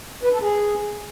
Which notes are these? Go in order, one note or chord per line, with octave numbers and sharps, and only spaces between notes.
B4
A4
G#4